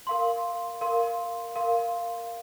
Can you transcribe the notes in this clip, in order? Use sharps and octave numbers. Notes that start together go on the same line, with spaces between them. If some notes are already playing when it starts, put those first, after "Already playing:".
A#4 F5 C6
A#4 F5 C6
A#4 F5 C6